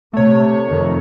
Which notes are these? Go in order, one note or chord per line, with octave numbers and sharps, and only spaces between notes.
C3 A3 C#5
F2 D#3